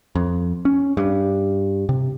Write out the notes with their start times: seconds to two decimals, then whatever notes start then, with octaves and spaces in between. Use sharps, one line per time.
0.15 F2
0.65 C#4
0.97 G2
1.89 C3